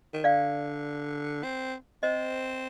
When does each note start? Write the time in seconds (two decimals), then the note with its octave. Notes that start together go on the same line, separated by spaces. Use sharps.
0.13 D#3
0.24 D3 D5 F5
1.43 C4
2.03 C4 C5 D#5